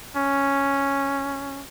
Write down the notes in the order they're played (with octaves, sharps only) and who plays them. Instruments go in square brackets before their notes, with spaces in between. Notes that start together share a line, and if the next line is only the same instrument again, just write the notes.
[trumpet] C#4